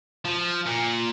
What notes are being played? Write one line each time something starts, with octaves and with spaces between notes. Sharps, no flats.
F3
A#2